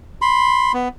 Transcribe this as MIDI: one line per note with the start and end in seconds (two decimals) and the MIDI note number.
0.22 0.72 83
0.22 0.72 84
0.74 0.88 59